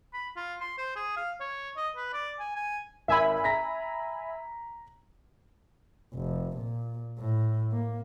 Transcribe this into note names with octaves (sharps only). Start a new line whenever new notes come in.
B5
F4
C6
C5
G#4
F5
C#5
D#5
B4
D5
G#5
G#5
G#1 E5 G#5 B5
A#5 A#6 B6
F1
A#2
A2
A#3